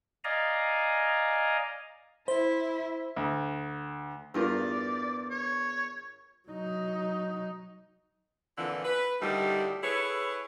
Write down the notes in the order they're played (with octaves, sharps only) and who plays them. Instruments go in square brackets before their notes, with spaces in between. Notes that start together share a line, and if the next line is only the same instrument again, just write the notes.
[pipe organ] D5 D#5 F5 G#5 A#5
[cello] E4 [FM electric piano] C5
[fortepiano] D2
[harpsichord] E2 [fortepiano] G2 F4 A#4 [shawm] D5
[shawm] C#5
[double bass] F#3 D#4
[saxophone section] F2 A#2 D3 E3
B4
D2 A2 D#3 G3
E4 G#4 A4 B4 C#5